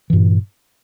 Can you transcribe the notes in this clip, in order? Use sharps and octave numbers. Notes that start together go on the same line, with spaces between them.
G2 A#2 E3